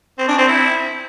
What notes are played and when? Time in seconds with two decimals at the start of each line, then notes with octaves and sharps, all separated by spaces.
0.18 C4
0.28 D4
0.38 C4
0.48 E4